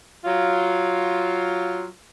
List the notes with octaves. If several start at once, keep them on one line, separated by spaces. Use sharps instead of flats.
F#3 F4